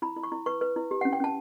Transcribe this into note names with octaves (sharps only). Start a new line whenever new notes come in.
E4 B5
E4
C#6
E4
B4 C#6
B4
E4
G4
C#4 F#5
G5
C#4 A5